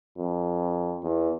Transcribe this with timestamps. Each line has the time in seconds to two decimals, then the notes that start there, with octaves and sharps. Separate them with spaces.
0.18 F2
1.04 E2